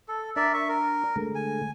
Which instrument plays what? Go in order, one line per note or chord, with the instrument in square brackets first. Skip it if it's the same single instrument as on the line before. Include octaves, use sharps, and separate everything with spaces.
[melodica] A4
[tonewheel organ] D4 [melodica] A#4 D5 E5
[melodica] E5 C#6
A#4
[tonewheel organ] D3 G#3 A3
[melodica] G#5